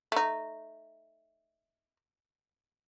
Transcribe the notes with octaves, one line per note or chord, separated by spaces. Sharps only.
A3 D#4